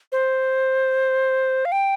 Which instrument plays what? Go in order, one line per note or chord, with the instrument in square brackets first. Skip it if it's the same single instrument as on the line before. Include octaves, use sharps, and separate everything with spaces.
[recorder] C5
F5
G5